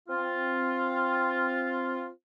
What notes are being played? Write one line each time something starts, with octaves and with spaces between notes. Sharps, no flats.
C4 F4